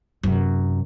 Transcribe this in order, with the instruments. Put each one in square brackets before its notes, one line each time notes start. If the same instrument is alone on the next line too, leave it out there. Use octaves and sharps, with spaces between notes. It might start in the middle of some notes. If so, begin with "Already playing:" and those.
[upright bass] F#2 C3